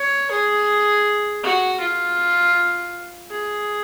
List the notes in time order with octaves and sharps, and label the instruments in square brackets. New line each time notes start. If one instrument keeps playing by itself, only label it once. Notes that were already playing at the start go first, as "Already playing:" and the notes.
Already playing: [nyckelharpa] C#5
G#4
F#4
F4
G#4